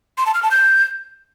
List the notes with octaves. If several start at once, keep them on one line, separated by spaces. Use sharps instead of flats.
C6
A5
F6
A5
G6